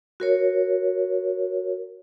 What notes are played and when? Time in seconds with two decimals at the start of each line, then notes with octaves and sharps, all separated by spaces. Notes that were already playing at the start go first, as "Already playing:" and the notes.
0.20 F#4 A#4 C#5